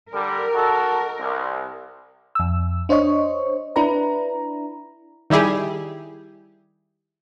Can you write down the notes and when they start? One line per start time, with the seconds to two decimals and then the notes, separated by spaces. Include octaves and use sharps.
0.12 D3 G3 A#4
0.55 D#4 F#4 A4
1.19 C2
2.35 F2 E6
2.89 D4 C5 C#5 D#5 C#6
3.76 D4 E4 B4 A#5
5.30 D#3 G3 E4 G4 G#4